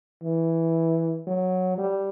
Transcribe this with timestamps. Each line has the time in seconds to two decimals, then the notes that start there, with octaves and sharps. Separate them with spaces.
0.23 E3
1.27 F#3
1.78 G3